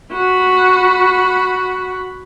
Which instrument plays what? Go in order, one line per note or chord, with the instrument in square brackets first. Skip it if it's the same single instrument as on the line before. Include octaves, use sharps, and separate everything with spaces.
[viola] F#4 B5